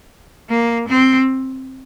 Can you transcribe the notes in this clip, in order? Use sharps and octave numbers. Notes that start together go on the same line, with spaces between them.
A#3
C4